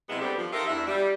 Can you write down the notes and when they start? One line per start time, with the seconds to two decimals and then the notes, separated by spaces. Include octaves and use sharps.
0.09 C3 F#3 G#3 B3 E4 F#4
0.20 G3 B3 C4 D4 G4 A4
0.38 F3
0.53 D#4 F4 G4 A4 A#4 E5
0.67 E2 D4 E4 E5
0.88 G3